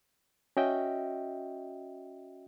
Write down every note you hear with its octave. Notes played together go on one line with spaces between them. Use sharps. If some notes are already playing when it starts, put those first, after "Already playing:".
C#4 F#4 D#5 E5 G5